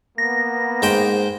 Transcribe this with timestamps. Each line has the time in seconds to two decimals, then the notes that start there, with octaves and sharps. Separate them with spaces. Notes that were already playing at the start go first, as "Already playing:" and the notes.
0.18 A#3 B3 A#6
0.82 G#2 C5 G5